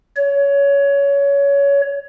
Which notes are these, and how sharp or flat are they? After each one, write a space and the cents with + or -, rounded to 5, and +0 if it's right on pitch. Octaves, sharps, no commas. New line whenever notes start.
C#5 +20